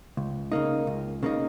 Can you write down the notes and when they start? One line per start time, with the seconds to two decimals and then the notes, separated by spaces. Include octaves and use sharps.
0.17 C#2
0.52 C#3 A#3 D#4
0.87 C#2
1.23 C#3 A#3 D#4